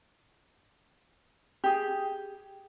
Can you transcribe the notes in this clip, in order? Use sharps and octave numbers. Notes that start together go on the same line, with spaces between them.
G4 G#4